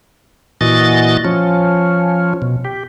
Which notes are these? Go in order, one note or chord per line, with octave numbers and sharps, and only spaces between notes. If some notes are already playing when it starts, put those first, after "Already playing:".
A#2 E3 F#4 D#5 A6
F3 C#4
B2
G4